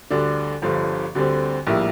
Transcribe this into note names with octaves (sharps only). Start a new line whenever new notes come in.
D2 D3 G3 D4
G1 G2 D3 F3
D2 D3 G3 C4
A#1 A2 G3 A#3 E4